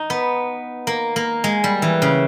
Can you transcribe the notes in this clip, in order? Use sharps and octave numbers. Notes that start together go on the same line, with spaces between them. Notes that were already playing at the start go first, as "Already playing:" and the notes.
Already playing: D#4
B3
A#3
A#3
G#3
G3
E3
C#3